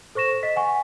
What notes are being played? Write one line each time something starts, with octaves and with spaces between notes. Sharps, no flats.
A4 C5 C#6 A#6 E7
D#5 B6
F#5 G#5 C#6